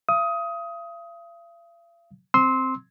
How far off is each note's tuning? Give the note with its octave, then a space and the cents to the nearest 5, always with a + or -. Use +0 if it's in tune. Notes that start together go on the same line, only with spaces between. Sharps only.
F5 -45 D#6 +20
C4 +0 C6 +5 E6 -30